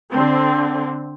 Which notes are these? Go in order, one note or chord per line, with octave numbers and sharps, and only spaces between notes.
D3 C4